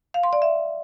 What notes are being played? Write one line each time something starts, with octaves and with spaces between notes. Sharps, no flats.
F5
C6
D5
E5